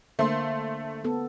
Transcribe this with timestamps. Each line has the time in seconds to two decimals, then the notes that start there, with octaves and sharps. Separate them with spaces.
0.19 D3 A3 A#3 C5 C6
1.04 B3 A4